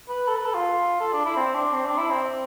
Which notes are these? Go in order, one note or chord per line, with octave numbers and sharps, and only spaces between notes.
B4
A4
B4
A4
F4
A4
D4
E4
C4
D4
C4
D4
E4
C4